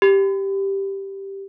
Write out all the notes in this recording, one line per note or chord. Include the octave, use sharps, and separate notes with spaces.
G4